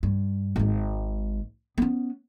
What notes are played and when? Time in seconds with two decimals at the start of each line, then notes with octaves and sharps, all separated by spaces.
0.03 G2
0.56 G#1 G#3
1.78 B3 C#4